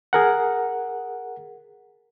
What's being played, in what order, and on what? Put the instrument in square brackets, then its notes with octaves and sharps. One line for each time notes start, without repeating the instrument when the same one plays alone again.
[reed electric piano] G#4 A#4 F#5